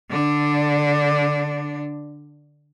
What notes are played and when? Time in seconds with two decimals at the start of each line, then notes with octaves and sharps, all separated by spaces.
0.10 D3 D4